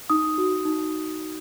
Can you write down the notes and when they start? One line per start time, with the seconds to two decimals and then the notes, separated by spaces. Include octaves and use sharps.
0.10 D#4 D#6
0.38 F#4
0.65 D#4